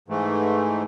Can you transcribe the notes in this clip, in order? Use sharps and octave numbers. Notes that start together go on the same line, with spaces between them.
G#2 E3 A3